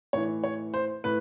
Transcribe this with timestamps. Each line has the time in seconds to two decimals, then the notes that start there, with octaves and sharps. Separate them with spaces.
0.13 A2 E3 C#5
0.44 C#5
0.74 C5
1.04 A2 B4